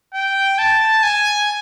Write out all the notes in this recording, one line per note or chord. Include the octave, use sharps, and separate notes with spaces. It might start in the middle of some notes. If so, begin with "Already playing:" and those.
G5
A5
G#5